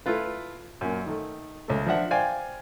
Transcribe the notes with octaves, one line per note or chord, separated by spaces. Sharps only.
A3 E4 F4 B4
F#2 A#2
D#3 A3
C#2 A3
F3 D4 E5 F#5
C5 D5 F5 G5 G#5